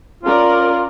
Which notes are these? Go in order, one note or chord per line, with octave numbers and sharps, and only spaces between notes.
C#4 F4 A#4 D5